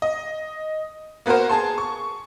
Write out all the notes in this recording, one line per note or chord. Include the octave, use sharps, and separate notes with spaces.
D#5
A#3 B3 F#4 A#4 C5
G#4 A5 C6
C#6